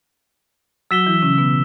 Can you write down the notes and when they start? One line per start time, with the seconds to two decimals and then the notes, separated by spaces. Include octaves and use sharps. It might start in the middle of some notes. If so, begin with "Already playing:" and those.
0.91 F#3 F#4 E6 B6 E7 G7
1.07 E3 E4
1.22 C#3 C#4
1.38 B2 B3